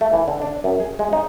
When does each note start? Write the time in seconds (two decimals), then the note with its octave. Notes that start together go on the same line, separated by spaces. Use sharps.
0.01 A3
0.13 E3
0.28 D3
0.42 D4
0.64 F#2
0.80 G#4
0.99 G#3
1.13 D#4